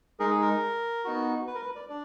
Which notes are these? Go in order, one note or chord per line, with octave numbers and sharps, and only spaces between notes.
G#3 D#4 G#4 A#4
G#4
A#4
B3 D#4 F#4
B4
A#4
B4
D5
D4 D5